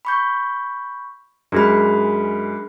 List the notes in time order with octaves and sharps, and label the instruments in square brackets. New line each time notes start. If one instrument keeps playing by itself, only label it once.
[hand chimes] B5 C#6 G6
[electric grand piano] F#2 G#3 F6 [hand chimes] D4 G#4 B5